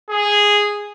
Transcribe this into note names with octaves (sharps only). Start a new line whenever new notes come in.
G#4